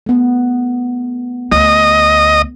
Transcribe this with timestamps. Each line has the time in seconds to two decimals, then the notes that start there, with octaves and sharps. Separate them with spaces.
0.06 A3 B3
1.52 D2 D#5